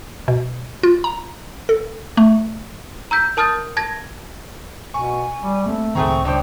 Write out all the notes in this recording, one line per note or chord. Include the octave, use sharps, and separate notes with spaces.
B2
F4
A#5
A4
A3
A#5 E6 G6 B6
A#4 A5 D#6 F6 G6 A6
A5 G#6 A#6
B2 G#5 C#6
G3
A3 A#3 C4
C#2 A2 D#3 A3 C4 G#4 A#5 C#6
D#1 C#2 D4 C5 G5